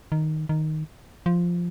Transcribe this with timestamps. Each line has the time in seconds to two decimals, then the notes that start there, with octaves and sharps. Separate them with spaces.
0.12 D#3
0.49 D#3
1.26 F3